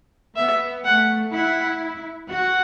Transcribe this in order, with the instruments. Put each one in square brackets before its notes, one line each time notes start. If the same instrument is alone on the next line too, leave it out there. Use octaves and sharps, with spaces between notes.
[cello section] B3 [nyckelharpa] E5
[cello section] A3 [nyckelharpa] F#5
[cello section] E4 [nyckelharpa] F#5
[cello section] F#4 [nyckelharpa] F#5